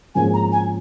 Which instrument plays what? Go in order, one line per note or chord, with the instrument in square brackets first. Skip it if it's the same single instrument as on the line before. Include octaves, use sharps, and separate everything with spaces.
[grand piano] G#1 G#2 F3 A#3 C#4 [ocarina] G#5
[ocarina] A#5
G#5